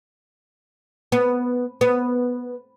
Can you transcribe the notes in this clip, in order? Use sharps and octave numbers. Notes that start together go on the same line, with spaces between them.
B3
B3